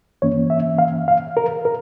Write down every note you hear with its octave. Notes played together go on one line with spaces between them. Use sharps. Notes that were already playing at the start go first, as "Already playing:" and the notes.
G2 E3 A#3 C#4 C#5
E5
F5
F5
A#4
A#4